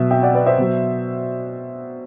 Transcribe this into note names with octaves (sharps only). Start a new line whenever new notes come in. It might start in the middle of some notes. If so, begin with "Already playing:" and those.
Already playing: B2 F#3 E5
E5 G5
D5 F#5
B4 D5
C5 E5
B2 F#3